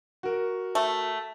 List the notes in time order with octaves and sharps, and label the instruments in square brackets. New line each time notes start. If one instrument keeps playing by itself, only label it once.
[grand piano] F#4 A#4
[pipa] A3